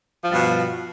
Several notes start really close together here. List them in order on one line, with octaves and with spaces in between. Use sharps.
F3 G2 B2